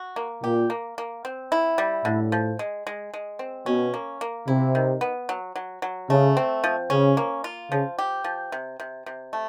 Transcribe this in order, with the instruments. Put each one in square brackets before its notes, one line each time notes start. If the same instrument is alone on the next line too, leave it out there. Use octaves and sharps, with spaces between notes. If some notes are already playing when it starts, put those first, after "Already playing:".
Already playing: [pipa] F#4
A#3
[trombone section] A#2 [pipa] G4
[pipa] A#3
A#3
C4
E4
G3
[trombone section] A2 [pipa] D3
[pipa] F3
G#3
G#3
G#3
C4
[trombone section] B2 [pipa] C#4
[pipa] A#3
A#3
[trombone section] C3 [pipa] E4
[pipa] D#3
B3
F#3
F#3
F#3
[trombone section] C#3 [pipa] A3
[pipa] C4
F3
[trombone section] C#3 [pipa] C#4
[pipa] A#3
F4
[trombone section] C#3 [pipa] F3
[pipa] G4
F3
C3
C3
C3
A3